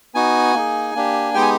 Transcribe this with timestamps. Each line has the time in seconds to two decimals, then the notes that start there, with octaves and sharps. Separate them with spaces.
0.14 B3 D#4 F#4 G#5
0.54 A#3 D#4 G#4
0.95 A#3 D4 G4
1.34 G#3 B3 D#4 G4 G5
1.42 G#5